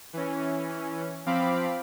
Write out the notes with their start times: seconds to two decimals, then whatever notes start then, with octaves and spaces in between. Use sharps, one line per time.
0.13 E3 C#4
1.26 F3 C4 F5 B5 D6